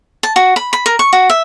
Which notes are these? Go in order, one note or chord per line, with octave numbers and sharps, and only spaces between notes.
A5
F#4
B5
B5
A#4
C#6
F#4
E5